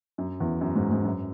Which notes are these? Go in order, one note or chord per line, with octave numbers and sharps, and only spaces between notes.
F#2
E2
F#2
G#2
G#2
F#2